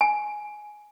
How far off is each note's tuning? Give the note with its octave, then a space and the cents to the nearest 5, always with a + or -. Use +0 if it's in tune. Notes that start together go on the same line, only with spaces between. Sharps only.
G#5 +10